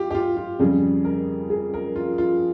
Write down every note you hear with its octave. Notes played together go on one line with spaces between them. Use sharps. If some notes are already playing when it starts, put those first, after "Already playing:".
Already playing: F4 G4
G4
F4
F4
F2 C#3 G3 G#4
A#4
G#4
A#4
F4
F4